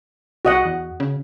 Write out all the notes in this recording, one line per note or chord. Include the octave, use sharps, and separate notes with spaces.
C2 F#4 D#5 F#5
E2
C#3